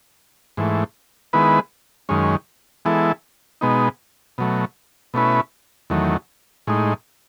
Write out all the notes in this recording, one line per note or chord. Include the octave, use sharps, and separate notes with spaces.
G#2 E3 A3
D#3 G#3 B3 E4 B4
F#2 D#3 G#3 C#4
E3 G#3 B3 E4 A4
B2 G#3 B3 D#4
B2 F#3 A3
B2 A3 C#4 E4 B4
E2 D#3 F#3 A3
A2 G#3 D#4